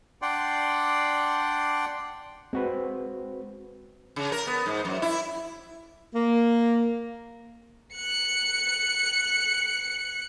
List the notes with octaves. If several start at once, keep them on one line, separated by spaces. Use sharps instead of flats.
D4 D5 F#5 G5 C6
G#3 C4 F#4 B4
C#3
A#4
B3
G#2
F#2
E4
A#3
F#6 C#7